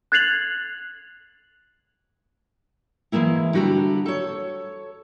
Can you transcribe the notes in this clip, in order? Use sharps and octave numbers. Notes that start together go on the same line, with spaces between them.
F#6 G#6 A6 C7 F7 F#7
E3 F3 G#3 A#3 E4
D3 G3 F#4 A4 A#5
A4 C#5